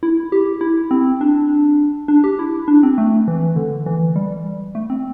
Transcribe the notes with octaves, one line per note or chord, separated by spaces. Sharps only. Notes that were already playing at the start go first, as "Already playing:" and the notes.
E4
G4
E4
C4
D4
D4
G4
E4
D4
C4
A3
E3
D3
E3
G3
A3
C4